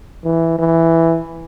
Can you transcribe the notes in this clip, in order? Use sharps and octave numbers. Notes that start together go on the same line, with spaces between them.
E3
E3